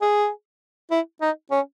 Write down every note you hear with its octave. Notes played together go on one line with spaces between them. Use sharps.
G#4
E4
D#4
C#4